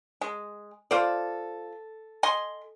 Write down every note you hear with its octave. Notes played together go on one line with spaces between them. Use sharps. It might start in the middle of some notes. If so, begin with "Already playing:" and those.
G#3
F4 A4 C5 D5
D#5 G#5 C6